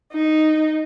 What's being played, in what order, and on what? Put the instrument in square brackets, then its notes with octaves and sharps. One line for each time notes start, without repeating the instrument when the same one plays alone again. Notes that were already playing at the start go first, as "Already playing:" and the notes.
[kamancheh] D#4